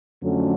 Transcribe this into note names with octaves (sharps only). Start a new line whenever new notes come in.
F2 D3 F#3 A3 C#4